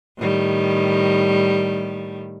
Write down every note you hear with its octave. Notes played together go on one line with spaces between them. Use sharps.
A2 D#3 G3